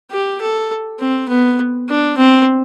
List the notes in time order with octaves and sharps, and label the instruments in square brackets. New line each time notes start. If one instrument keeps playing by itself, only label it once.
[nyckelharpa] G4
A4
C4
B3
D4
C4